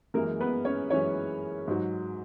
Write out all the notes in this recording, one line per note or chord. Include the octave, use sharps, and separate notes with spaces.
F#2 E3 G#3 A#3 A#4
B3 B4
C#4 C#5
F#2 E3 G#3 C#4 C#5
G#2 F#3